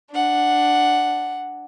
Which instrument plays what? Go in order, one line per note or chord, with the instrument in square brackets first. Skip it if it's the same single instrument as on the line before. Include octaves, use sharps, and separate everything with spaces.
[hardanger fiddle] D4 F#5